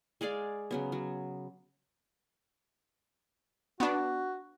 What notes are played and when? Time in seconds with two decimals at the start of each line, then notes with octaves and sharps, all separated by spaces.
0.21 G#3 G#4 D5 F5
0.71 C#3 F#3 B3
0.92 F#3
3.80 B3 D4 F#4